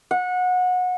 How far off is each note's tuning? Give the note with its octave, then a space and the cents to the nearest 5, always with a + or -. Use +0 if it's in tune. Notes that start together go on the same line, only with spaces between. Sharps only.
F#5 -25